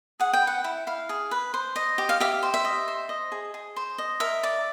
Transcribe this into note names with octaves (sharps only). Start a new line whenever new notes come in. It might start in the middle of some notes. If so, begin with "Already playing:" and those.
G#4 F#5
G5
B4
F#5
E4
E4 F5
G#4
B4
C5
D#5
G4
F5
G4 E5
C5
E5
D#5
C5
D#5
G#4
G#4
C5
D#5
A#4 E5
D5